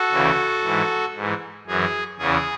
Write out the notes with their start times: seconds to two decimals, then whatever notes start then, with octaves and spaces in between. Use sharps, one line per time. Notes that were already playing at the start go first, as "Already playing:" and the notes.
Already playing: F#4 A4
0.12 D2 C#3 E3
0.64 G#2 E3
1.15 G#2 E3
1.67 F#2 E3 G#4
2.18 E2 C#3 E3 G#4